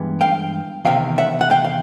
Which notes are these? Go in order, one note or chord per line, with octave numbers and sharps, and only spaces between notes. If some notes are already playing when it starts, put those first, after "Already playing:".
Already playing: G2 E3 G#3 B3
F5 G5
E2 C3 D#3 F5 G5
E5 F#5
F#5
F5 G5
F5